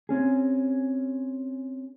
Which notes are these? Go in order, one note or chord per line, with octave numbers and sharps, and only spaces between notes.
C4 C#4 G#4